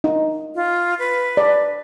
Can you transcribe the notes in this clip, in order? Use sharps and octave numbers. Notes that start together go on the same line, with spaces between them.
D#4
F4
B4
D5